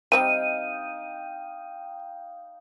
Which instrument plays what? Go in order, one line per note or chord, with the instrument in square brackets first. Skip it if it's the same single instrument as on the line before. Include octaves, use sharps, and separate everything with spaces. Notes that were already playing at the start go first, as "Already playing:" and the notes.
[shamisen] G3 C4 G4 [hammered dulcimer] D#4 F5 G5 [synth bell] D#7